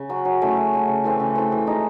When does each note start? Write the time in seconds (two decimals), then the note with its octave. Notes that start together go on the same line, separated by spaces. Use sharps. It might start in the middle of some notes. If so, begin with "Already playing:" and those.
Already playing: C#3
0.09 F#3 C#4 F#4
0.25 F#3
0.42 A3 C#4 E4
0.56 F#3
0.73 A3 C#4 E4
0.88 C#3
1.04 E3 A3 C4
1.20 C#3
1.36 E3 A3 C4
1.52 E3
1.67 G#3 D#4